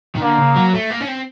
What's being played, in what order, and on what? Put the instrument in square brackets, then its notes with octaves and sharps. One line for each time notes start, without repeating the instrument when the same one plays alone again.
[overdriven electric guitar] D#3
[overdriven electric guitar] D3 [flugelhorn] A#3
[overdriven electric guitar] C#3
F#3
A3
A#3
C#4
C4